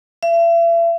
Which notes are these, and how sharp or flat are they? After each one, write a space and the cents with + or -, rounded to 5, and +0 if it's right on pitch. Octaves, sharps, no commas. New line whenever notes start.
E5 +40